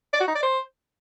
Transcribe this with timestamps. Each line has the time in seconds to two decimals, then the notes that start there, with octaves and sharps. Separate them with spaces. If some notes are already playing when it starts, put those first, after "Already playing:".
0.13 D5
0.21 F#4
0.28 D#4
0.35 D5
0.43 C5